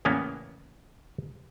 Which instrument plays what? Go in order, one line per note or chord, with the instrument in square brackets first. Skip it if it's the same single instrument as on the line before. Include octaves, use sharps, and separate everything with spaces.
[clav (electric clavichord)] E2 A2 C#3 A#3 B3 C#4